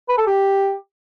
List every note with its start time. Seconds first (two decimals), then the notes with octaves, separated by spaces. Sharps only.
0.09 B4
0.18 A4
0.27 G4